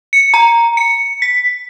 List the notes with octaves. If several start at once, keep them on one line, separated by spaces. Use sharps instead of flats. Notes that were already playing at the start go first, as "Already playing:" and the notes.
C#7
A#5
C#7
B6